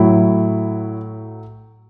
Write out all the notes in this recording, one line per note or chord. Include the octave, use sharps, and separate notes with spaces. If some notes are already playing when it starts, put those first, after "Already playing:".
Already playing: A2 F#3 E4